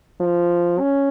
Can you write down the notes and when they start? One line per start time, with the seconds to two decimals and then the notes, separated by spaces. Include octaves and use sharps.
0.21 F3
0.80 C#4